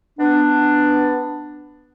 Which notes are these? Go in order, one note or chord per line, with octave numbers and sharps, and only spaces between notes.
B3 D4